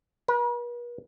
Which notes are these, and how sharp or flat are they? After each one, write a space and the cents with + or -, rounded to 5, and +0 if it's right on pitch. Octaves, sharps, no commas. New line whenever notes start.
B4 -45